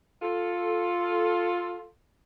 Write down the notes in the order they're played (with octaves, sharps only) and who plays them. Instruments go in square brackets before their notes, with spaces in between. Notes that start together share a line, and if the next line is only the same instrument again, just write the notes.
[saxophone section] F4 A4